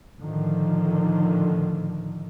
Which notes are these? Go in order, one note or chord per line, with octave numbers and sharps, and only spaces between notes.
A2 D3 D#3 F3